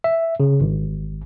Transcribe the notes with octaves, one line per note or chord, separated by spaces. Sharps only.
E5
C#3
G#1